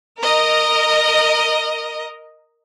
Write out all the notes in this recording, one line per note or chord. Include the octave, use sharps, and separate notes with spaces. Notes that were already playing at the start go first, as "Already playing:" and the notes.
A#4 D#5